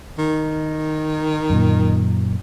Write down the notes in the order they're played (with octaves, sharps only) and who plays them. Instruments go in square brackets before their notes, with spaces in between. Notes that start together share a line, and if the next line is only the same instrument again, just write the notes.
[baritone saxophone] D#3
[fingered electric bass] F#2 A#2